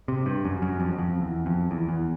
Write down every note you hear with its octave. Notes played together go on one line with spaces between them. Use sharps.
C3
G2
F#2
F#2
F2
F#2
F2
E2
F2
E2
E2